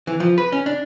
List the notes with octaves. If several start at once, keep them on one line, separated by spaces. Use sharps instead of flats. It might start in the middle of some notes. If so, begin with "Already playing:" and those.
E3
F3
B4
C#4
D4